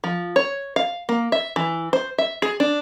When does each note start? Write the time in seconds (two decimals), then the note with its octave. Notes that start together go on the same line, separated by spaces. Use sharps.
0.04 F3
0.36 C#5
0.76 F5
1.09 A#3
1.32 E5
1.56 E3
1.93 C5
2.18 E5
2.42 G#4
2.60 D4